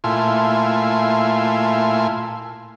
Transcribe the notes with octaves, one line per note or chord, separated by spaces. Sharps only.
A#2 A3 E4 F4 G#5 C6